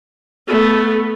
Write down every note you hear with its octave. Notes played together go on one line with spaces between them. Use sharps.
A3 B3